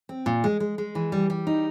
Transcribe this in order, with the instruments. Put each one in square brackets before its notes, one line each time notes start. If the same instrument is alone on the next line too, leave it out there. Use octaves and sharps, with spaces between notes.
[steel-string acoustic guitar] C4
A#2
G#3
G#3
G#3
E3
G3
G3
D#4